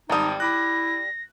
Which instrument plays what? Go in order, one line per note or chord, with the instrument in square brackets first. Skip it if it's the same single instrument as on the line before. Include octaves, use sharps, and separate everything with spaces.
[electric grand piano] G#1 A5 D#6 [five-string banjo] G3 G5 [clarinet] D#4
[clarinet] E4 [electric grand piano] B5 D6 F#6 [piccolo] A#6